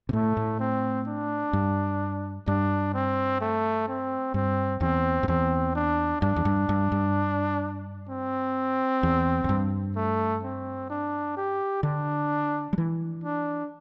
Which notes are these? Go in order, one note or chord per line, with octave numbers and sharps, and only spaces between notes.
C3
A2 A3
A2
C4
D4
G2
G2 D4
C4
A3
C4
G2 C4
E2 C4
G2
E2 C4
D4
G2 D4
E2
G2
G2
G2
C4
E2
E2
G2
A3
C4
D4
G4
D3 D4
G3
E3
D4